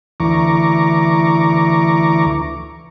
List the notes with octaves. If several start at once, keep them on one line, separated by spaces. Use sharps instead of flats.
D2 E3 A#5 C#6 D6